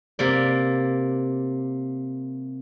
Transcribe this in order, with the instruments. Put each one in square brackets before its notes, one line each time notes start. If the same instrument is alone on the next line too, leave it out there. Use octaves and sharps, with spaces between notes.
[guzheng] C3 A#3 D5